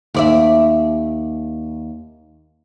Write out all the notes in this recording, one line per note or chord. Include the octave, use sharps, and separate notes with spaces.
D#2 D5 E5